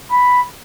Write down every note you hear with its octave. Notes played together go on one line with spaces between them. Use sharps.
B5